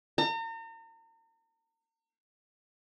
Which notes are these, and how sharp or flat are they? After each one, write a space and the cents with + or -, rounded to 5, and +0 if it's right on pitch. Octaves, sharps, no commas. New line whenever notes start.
A#5 -40